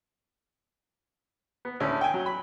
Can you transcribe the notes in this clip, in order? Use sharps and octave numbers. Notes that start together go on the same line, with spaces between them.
B3
D2 A2 C#4
G5 G#5
F#3
B5